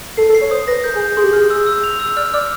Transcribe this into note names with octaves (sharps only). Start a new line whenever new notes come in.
A4 C7
A4
C7
C#5
C5 D#6
B4 A#6
A#4 G6
G#4
G6
G#4 C6
G4
G#4 F6
E6
E6
F7
E6
D5 F6
D5 F6